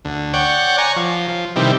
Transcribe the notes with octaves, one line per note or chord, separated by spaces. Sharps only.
D2
C#5 D5 F#5 G5
C#5 G#5 A#5
F3
F3
C3 D#3 E3 G3